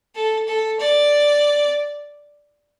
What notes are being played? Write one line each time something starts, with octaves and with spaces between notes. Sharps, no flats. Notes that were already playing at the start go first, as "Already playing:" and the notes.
A4
A4
D5